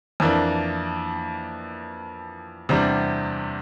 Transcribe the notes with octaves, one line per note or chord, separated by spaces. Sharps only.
F2 E3 A#3 D4
E2 C3 G3 D4